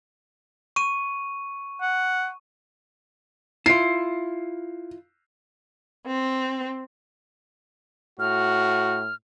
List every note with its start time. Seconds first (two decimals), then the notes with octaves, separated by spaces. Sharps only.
0.76 C#6 D#7
1.81 F#5
3.66 E4 F4 C7
6.06 C4
8.19 A2 F#4 F6